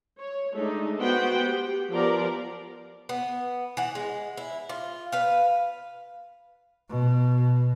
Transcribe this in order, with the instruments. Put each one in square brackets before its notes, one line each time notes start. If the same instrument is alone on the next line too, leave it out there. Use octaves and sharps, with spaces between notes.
[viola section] C#5
G#3 A3 D4 D#4
B3 F#4 C5 F#5 G5
G4
F3 B3 G4 A#4 D5
[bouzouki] B3
E3 F#5
G#3
E4
F4
B4 F5
[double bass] B2